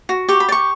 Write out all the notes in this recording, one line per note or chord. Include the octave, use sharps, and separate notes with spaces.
F#4
G4 C#6
B5
D5
C#6